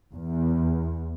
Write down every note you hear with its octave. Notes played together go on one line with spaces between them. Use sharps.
E2